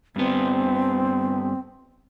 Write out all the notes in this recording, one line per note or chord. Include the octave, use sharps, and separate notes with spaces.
G2 B3 C4